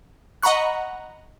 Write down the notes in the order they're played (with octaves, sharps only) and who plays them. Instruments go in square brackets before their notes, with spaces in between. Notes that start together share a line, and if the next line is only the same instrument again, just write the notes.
[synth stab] D#5 F#5 A#5 B5 C#6 F#6